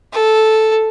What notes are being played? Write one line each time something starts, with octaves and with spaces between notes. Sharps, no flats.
A4